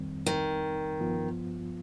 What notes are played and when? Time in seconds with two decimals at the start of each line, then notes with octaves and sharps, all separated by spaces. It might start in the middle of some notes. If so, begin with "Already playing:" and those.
Already playing: F2 D#3 G3 C4
0.26 D#3
1.00 G2 F3 B3 F4